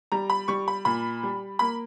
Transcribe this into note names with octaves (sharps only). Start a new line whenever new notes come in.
G3 A#5
B5
G3 C#6
B5
A#2 B5
G3
A#3 B5